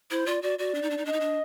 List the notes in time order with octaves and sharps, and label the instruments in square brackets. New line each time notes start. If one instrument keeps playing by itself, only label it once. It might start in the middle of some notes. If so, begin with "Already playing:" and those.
[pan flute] E4 [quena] C5
[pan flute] F4 [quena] D5
[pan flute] F#4 [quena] D5
[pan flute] F#4 [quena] D5
[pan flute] D4
D#4
D4
D#4
[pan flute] D4 [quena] D#5
[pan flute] D#4
D4